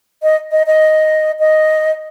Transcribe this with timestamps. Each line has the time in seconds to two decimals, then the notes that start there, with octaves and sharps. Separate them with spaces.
0.23 D#5
0.51 D#5
0.66 D#5
1.39 D#5